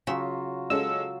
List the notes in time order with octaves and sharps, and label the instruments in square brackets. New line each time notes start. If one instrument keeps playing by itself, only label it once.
[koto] C#3 E5 [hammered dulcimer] F#3 F4 F#4
[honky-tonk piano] G#3 C#4 A4 [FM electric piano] E6